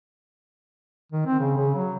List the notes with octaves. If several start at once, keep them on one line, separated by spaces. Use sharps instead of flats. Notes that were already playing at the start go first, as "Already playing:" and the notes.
D#3
C4
C#3
C#3
F#3